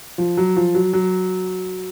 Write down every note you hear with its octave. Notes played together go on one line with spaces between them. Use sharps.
F3
F#3
F3
F#3
F#3